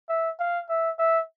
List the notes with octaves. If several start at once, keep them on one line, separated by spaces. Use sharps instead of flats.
E5
F5
E5
E5